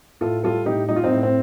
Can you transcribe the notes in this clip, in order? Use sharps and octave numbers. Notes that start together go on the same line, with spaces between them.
A2 F4 A4
G3 F4 A4
A2 D#4 G4
G3 D#4
F4
C4 D#4
A2
C4